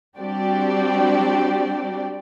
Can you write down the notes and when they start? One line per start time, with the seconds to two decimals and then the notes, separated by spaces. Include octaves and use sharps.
0.18 G3 C4 D4 F#4 G4 D5